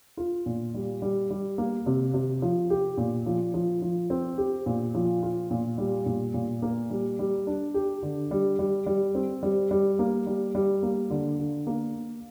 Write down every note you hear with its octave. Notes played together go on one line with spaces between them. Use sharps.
F4
A#2
G3
G3
G3
A#3
C3
C3
F3
G4
A#2
F3
F3
F3
C4
G4
A#2
F3
F4
A#2
G3
A#2
A#2
A#3
G3
G3
D4
G4
D3
G3
G3
G3
C4
G3
G3
A#3
G3
G3
A#3
D3
D3
A#3